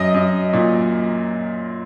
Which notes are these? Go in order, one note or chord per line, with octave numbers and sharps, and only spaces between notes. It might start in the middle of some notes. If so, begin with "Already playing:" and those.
Already playing: F#2 D#5
F#2
A#2